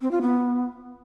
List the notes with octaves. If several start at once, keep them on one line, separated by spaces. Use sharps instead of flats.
C4
F4
B3